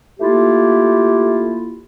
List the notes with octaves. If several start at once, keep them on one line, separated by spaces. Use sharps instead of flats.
A3 A#3 E4 F4 G4